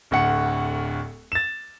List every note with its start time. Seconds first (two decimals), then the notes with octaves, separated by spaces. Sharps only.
0.11 D1 D2 F#5 C#7
1.32 A6 E7